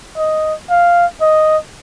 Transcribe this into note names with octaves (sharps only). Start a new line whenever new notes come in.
D#5
F5
D#5